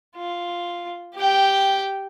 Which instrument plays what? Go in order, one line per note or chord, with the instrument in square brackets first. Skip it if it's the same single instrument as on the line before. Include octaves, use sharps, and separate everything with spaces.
[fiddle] F4
G4 G5